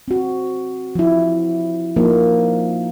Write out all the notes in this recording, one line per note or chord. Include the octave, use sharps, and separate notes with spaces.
C4 F#4
F3 E4
F3 A#3 D#4